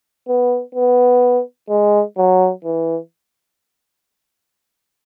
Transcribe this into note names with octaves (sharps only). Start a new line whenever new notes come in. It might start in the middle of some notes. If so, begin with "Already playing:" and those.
B3
B3
G#3
F#3
E3